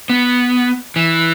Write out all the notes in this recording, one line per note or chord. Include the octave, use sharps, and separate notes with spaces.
B3
E3